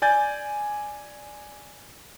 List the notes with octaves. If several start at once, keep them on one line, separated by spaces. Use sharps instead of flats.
D5 G#5 G6 A6